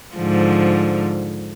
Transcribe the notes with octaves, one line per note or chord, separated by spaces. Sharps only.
G#2 D3 F3